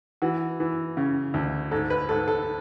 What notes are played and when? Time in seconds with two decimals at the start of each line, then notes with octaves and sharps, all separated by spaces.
0.22 E3 F#4
0.60 E3
0.97 C#3
1.34 D2
1.71 G#2 A4
1.90 B4
2.09 G#2 A4
2.28 A4